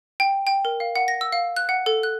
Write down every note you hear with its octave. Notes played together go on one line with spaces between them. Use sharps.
G5
G5
A#4
F5
F#5
A#6
E6
F5
F#6
F#5
A4
F#6